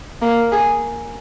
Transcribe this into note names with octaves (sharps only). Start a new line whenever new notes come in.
A#3
G#4